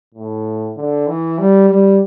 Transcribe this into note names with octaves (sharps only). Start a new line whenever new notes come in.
A2
D3
E3
G3
G3